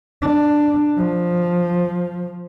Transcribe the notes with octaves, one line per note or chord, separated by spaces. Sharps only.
D4
F3